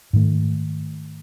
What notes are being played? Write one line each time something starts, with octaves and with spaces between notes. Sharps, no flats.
G#2 D#3 A3